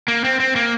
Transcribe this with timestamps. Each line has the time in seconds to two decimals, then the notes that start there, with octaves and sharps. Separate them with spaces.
0.08 A#3
0.24 C4
0.40 C4
0.56 A#3